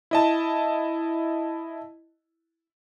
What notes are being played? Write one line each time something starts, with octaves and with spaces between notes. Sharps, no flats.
E4 D#5 A5